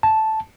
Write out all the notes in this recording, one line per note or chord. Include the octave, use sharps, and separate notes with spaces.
A5